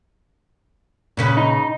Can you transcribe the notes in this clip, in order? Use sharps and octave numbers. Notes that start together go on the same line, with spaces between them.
A#2 C#3 B4
D#4